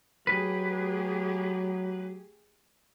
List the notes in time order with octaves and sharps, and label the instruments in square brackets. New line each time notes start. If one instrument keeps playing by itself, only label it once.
[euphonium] F#3 [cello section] A3 G4 G#4 [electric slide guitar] B4